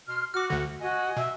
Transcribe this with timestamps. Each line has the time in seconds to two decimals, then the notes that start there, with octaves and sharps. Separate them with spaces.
0.08 B2 C6 F6
0.34 F#4 D6 F6
0.50 D2 D3
0.81 F#4 D#5 G#5
1.17 B2 E5